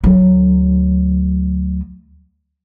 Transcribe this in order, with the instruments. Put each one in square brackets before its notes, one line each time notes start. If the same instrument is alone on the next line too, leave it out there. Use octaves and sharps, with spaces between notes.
[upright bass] D2 F#3